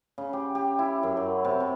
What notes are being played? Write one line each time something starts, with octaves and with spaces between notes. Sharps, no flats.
C#3
G4
G4
E4
F#2
F#3
C3
C3